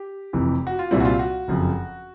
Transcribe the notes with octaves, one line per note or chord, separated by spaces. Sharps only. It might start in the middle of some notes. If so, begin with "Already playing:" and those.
Already playing: G4
F1 F2 C3 E3
F#4
F4
C2 A#2 G3 C4 E4
F#4
F4
F#4
F#1 F2 C#3 F3